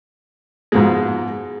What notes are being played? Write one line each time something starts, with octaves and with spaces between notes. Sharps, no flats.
G#2 B2 F3 G#3